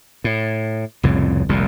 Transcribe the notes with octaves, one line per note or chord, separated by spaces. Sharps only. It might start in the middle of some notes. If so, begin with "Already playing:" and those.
A2
C2 F2 A2 C#3
F1 C2 A#2